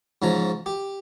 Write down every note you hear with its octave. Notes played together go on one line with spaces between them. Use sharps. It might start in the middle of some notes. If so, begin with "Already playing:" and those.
G#2 C#3 F3 A#5
G4